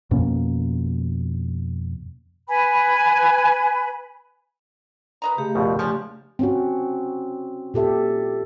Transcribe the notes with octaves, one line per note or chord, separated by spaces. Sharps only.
F2 B2 A#3 C#4
B4 G#5 B5
B4 D#5 A#5
C#3 A3 G4
A#1 F2 B2
B2 F3 C#4 D4
C4 C#4 F#4
A#2 G4 A4 E5